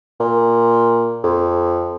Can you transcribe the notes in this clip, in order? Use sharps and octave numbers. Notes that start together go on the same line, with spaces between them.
A#2
F2